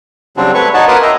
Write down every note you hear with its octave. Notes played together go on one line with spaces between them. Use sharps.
C#3 F#3 G3 C4 D4
A3 B4 C#5 C#6
D#4 F#4 C#5 F#5 A5
A#3 A#4 B4 C6 D6 D#6
D#5 E5 G5 A#5